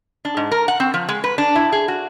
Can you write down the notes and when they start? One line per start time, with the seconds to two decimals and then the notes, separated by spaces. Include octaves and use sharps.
0.25 D4
0.37 G#2
0.51 A#4
0.68 F#5
0.80 C4
0.94 F3
1.09 G#3
1.24 B4
1.38 D4
1.55 E4
1.72 G#4
1.88 F#4